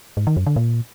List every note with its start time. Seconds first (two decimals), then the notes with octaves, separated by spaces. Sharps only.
0.17 G#2
0.27 D#3
0.37 F#2
0.46 D3
0.56 A#2